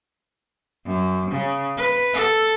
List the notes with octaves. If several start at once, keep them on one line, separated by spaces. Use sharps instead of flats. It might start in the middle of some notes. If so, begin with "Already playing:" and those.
F#2
C#3
B4
A4